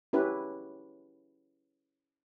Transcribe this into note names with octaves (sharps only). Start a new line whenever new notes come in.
C#4 E4 G4 B4